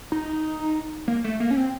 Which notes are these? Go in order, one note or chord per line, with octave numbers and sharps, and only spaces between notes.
D#4
A#3
A3
A#3
C#4
C4